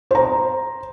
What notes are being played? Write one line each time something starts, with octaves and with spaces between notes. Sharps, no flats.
C5 A#5